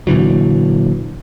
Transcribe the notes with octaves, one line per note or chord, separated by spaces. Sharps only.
A#2 D3 E3 F#3